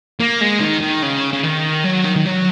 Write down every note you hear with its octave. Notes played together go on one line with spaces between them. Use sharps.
A#3
G#3
D#3
D#3
C#3
C#3
D#3
F#3
D#3
D#3
F#3